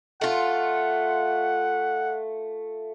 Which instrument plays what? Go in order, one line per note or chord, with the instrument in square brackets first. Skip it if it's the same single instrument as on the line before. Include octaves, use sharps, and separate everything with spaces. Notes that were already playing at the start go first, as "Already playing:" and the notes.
[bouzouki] A3 F4 [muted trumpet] F#5